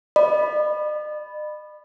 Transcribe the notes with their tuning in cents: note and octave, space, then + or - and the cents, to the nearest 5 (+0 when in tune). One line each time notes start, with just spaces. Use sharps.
D#5 -45 B5 +0